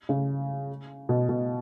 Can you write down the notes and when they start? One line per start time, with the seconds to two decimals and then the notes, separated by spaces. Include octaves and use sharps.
0.09 C#3
1.09 B2
1.29 B2